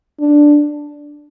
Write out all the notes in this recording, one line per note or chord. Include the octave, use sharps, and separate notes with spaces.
D4